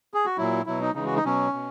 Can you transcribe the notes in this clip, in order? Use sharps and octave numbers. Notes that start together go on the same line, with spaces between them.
G#4
F#4
A#2 F#3 E4
B2 F#3 E4
D#4
C#3 E3 G#3 D#4
F#4
D#4
B2 F#3 C#4
B2